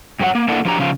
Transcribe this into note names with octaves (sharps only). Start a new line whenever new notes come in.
G2 F#3 G4 C#5 F#5
A#3
A#3 D4 E4 A4 F#5
F3 F#3 D4 G4 A#5
C#3 F3 F4